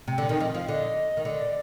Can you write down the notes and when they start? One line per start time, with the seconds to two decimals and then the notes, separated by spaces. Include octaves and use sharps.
0.08 C3
0.18 D3
0.29 D#3
0.40 F3 D#5
0.55 F3 F5
0.68 D3 D#5
1.17 D#3
1.25 D3 D#5
1.39 D5